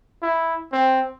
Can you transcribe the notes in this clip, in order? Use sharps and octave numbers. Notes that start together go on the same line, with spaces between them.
E4
C4